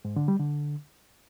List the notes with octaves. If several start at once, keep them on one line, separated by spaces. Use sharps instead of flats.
G#2
D3
G3
D3